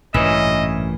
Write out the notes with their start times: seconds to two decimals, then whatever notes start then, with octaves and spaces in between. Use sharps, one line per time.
0.14 A1 G2 A#2 E3 C#4 D#5 E5